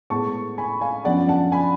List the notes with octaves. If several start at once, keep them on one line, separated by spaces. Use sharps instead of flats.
A2 G#3 B3 A5 C#6
G#5 B5
F5 G#5
F#2 F3 B3 D4 D5 F#5
F#5 A5
G#5 B5